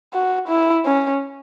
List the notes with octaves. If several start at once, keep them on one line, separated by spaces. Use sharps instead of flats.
F#4
E4
C#4